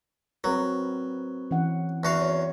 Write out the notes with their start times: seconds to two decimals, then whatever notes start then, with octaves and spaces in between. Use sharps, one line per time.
0.44 F#3 C4 A#4 B4
1.51 E3 C#4 F#5
2.03 E2 F#4 F5
2.22 C#5